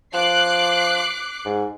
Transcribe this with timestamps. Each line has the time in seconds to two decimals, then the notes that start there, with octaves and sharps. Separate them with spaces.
0.14 F3 D6 F#6 C7
1.45 G#2